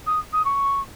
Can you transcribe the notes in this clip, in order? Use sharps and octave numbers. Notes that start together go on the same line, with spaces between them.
D#6
D#6
C#6